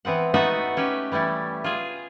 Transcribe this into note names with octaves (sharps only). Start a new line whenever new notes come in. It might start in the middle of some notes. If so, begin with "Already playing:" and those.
E3 B3 C4 F#5
A3 B3 D#4 F#4 E5 F#5
C#4 G4 B4
E3 G3 A3 E4
F4 G#4